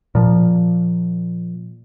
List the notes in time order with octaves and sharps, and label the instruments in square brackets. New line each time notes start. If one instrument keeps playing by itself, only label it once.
[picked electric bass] A#2 F3